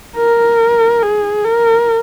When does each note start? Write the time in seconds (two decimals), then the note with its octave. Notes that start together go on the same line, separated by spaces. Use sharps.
0.16 A#4
1.03 G#4
1.45 A#4